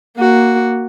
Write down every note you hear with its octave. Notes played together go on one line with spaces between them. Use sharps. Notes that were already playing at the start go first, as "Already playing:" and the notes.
A#3 F#4